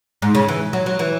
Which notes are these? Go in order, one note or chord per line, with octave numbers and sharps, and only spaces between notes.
G#2
C#3
E3
F#3
F#3
E3